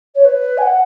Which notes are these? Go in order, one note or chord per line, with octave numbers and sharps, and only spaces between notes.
C#5
B4
G#5
F#5